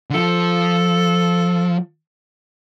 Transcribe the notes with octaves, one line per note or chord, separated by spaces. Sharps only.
D3
F3 A4